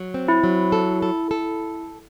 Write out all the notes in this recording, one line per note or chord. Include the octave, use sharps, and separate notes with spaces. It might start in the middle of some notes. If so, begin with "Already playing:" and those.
Already playing: F#3
C4
E4
F#3
A4
A4
A4